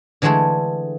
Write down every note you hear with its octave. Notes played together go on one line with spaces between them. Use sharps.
D3 E3 G#3 A3 G#4 A4